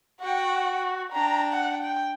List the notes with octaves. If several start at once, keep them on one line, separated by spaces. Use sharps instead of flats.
F#4 F#5 G5
D4 G5 A#5
F#5
G5